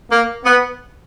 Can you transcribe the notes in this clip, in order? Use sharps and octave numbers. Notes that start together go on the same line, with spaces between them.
A#3
B3